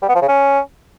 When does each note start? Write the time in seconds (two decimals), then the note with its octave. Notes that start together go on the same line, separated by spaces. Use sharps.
0.02 G3
0.09 B3
0.15 F3
0.22 C#3
0.28 C#4